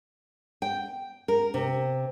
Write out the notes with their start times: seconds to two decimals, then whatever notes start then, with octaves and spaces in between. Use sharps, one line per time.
0.62 G5
1.28 A#4
1.54 C3